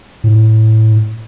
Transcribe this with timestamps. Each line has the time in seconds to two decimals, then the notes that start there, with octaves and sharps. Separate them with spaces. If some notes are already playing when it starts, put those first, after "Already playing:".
0.24 A2